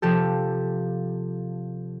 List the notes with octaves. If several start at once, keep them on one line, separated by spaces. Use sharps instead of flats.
C3 F3 G4 A4